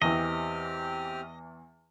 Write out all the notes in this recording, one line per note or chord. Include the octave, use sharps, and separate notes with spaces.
E2 E3 C4 G4 D#5 F6